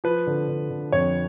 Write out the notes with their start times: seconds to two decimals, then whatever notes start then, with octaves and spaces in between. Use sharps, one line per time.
0.04 F3 B4
0.27 D3
0.48 D3
0.70 D3
0.92 F2 C#5